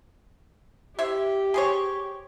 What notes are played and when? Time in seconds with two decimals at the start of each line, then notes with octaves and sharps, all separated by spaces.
0.99 E4 G4 C5 E5
1.54 G#4 C5 C#5